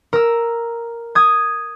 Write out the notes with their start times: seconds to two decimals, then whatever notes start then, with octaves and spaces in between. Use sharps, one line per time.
0.13 A#4 E6
1.15 D#6 G#6